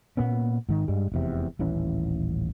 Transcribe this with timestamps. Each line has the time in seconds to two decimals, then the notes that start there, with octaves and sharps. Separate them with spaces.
0.17 A#2 A#3 B3 C#4
0.69 G#2 D#3
0.88 G2 G3 G#3
1.12 F1 E2 C3
1.59 D#1 A1 E3 C#4